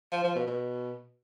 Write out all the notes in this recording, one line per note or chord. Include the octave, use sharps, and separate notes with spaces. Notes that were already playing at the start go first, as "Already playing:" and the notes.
F3
F3
B2
B2